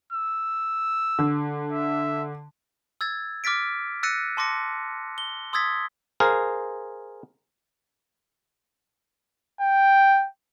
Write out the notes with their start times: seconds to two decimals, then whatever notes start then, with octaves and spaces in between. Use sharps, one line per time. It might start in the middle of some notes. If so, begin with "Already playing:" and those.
0.13 E6
1.19 D3
1.72 E5
3.01 E6 G#6 A6
3.44 D6 F6 A6 B6 D7
4.03 E6 F#6 A6 A#6 C#7 D#7
4.37 A5 C6 D6 A#6 C#7
5.18 G7
5.53 C6 D#6 E6 G#6 A6 B6
6.20 G#4 A#4 C5 F5
9.61 G5